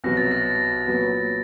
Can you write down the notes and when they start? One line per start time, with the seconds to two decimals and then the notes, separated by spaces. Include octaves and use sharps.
0.04 C2 B2 F#3 A#6
0.17 A6
0.31 A#6
0.87 A#2 F#3 B3